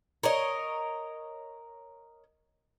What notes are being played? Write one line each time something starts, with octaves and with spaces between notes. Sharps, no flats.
A#4 C#5 D#5